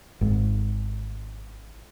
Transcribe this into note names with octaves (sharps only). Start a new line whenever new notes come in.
G#1 G#2